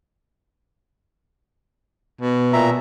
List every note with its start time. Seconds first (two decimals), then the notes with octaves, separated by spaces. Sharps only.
2.21 B2
2.53 A#2 E5 A#5